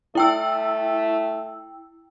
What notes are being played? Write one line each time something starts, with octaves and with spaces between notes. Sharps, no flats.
A3 E4 G5 E6